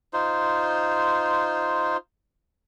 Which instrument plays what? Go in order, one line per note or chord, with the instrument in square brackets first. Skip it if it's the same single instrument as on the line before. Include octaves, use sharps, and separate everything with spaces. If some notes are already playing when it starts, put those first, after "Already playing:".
[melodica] D#4 F4 C5